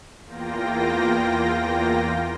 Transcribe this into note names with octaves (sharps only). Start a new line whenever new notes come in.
E2 A#3 F4 G5 A#6